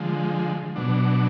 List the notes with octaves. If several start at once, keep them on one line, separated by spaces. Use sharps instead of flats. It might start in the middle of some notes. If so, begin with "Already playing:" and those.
Already playing: D3 F3 G#3
B2 F#3 D4